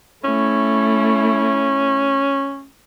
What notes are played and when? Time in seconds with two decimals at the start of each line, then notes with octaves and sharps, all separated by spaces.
0.24 A3 C#4 E4